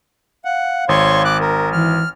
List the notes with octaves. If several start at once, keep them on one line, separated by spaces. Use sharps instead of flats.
F5 F#5
G#1 C#5 C6 C#6
D6 F#6
A#4
E3 F6